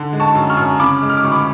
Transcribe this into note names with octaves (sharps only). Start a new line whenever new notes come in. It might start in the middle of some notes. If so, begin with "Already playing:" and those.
Already playing: D3
G#3
A5 C#6
F#2
C#6 F6
F#2
C#3 B5 D6
G#3
F6
D6
D2 C#6
B5 D6